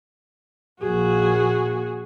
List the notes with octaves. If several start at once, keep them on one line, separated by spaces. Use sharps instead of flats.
A#1 F#4 G#4